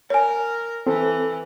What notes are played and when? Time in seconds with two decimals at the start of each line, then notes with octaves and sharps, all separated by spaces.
0.10 A#4 C#5 G#5
0.87 E3 C4 A4